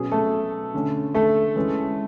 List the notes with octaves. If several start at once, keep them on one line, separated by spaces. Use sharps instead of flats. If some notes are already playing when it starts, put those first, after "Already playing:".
Already playing: B2 F#3 C#4 G#4
A3 A4
D3 A3 C#4
A3 A4
E3 G#3 C#4